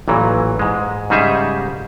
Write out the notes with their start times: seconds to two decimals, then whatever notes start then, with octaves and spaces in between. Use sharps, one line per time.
0.08 A1 A#2 E3 F#3
0.59 G#2 G#3
1.10 G#2 C#3 G3 D#4 G#4 E5